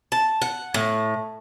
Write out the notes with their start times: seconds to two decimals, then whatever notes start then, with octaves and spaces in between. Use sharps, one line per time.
0.12 A5
0.42 F#5
0.74 A2